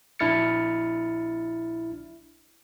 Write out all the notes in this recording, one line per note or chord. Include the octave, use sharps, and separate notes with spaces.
A#1 D4 E4 F6 A6 C#7